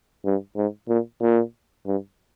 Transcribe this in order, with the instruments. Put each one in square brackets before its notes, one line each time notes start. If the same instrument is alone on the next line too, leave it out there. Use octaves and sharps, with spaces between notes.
[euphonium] G2
G#2
A#2
A#2
G2